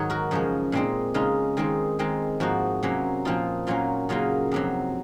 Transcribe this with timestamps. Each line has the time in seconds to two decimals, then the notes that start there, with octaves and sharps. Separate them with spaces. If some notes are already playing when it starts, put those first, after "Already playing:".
Already playing: G#2 D#3 F#3 G#4 C#5
0.10 F#4 A#4
0.31 F#2 C#3 F3 G#3 C#4
0.72 A#2 G#3 C4 D#4
1.14 C#3 G#3 D#4 F4
1.57 D#3 G#3 C4 D#4
1.99 D#3 G#3 C4 D#4
2.40 G#2 F3 A#3 D#4 F#4
2.83 C3 F#3 A#3 C#4
3.25 A#2 F3 C4 D#4 F4
3.67 A#2 F#3 A#3 C#4 F4
4.09 C#3 F#3 A#3 D#4 F4
4.52 F2 C3 F#3